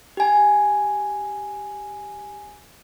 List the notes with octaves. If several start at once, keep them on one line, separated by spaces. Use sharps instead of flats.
G4 G#5